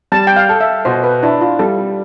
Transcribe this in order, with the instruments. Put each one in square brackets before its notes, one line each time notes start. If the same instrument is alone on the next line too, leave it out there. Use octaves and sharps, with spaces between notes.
[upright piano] G3 [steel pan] A5
[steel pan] G5
F5
[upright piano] A4
[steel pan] E5
[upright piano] B2 [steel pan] C5
[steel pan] B4
[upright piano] D4 [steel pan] E4
[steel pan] F4
[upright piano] G3 [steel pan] A4